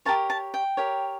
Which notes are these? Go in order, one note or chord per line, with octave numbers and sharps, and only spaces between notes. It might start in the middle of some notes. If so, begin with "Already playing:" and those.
G4 A#4 C#5 A5
A5
G5
G4 A#4 C#5